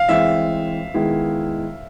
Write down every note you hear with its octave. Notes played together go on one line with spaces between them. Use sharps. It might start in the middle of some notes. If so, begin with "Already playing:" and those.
Already playing: F5
E3 G#3 C4 E5
D#3 G#3 B3 E4